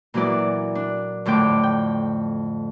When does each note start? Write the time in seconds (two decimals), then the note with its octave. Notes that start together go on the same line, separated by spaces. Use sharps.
0.14 A#2 E3 F#3 B3 D5
0.75 D4
1.25 F2 A2 D3 G5 D6
1.63 G5